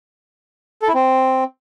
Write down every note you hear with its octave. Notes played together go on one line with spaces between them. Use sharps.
A4
E4
C4